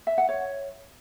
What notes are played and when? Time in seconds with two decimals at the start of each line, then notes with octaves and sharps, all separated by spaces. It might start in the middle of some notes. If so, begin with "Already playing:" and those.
0.07 E5
0.18 F#5
0.29 C#5